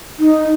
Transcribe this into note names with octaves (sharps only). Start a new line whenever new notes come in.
D#4